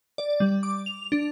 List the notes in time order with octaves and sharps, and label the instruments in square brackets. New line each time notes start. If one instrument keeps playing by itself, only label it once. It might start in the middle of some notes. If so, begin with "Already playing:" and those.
[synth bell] D5
G3
D6
F7
D4